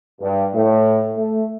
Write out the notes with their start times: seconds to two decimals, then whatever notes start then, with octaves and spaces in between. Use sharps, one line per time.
0.21 G2
0.53 A2
1.17 A3